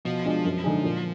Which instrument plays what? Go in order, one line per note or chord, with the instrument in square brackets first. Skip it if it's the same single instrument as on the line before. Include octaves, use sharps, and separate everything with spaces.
[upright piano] B2 [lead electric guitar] F3
[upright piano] G#3 D4 F4 G#4
F#2
D3 G#3 D#4 G#4
A#2